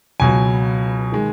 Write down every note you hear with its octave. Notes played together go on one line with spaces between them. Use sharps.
C#2 B2 F#3 G#5
D#3 G#3